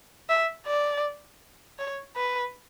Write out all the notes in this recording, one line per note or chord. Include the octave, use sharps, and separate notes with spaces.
E5
D5
C#5
B4